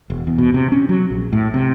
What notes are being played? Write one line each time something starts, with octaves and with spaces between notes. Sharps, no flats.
E1
E2
B2
C3
C#4
F#3
A#1
A2
C3